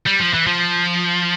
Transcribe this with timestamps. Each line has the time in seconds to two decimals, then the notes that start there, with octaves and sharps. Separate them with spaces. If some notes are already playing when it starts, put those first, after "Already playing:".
0.06 G3
0.19 F3
0.34 E3
0.47 F3